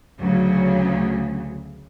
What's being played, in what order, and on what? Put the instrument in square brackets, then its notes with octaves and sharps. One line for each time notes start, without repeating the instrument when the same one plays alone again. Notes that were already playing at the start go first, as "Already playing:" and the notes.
[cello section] D2 C#3 F#3